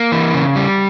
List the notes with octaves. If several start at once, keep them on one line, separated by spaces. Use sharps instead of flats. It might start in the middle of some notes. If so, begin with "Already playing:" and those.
Already playing: A#3
E3
C#3
G3